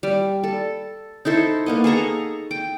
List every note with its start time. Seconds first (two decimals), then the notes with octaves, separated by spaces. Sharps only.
0.03 G3
0.43 A4
1.25 D#4 E4 A4 C5
1.66 A#3 B3 D#5
1.84 G#4 A4 A#5 C#6
2.51 G5